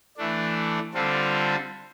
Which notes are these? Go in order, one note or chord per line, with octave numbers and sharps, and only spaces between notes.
E3 A3 D4
D3 G3 C4 F4 A4